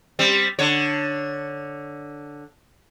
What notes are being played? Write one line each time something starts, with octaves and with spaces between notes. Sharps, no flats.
G3 C4
D3 C#5